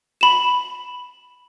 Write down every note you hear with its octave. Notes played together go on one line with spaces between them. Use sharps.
B5 E7